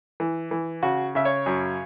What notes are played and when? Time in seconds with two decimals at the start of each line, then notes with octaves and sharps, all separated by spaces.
0.20 E3
0.51 E3
0.83 C#3 F#4
1.15 C#3 E5
1.25 C#5
1.46 F#2